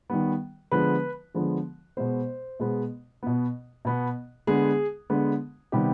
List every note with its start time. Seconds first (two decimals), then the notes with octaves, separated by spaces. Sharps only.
0.10 D#3 G3 B3
0.71 D3 F3 G#3 B3 B4
1.35 D3 F3 G#3 B3
1.97 B2 G#3 B3 C5
2.60 B2 G#3 B3
3.23 B2 B3
3.85 B2 B3
4.47 D3 G#3 B3 G#4
5.10 D3 G#3 B3
5.72 C3 D#3 G3 B3 G4